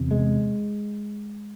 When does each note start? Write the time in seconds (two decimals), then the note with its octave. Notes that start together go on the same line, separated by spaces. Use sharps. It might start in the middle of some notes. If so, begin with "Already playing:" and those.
Already playing: E2 C3
0.11 G#3